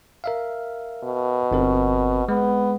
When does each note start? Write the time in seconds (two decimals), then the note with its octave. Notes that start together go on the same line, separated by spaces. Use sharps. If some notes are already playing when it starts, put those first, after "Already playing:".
0.24 A#4 E5 F5
1.04 B2
1.51 G1 C4 A#4
2.29 G#3 B3